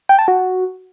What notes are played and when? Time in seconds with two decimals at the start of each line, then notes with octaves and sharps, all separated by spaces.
0.09 G5
0.19 A5
0.28 F#4